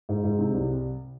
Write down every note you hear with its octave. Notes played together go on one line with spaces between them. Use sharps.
G#2
G#2
C3
C2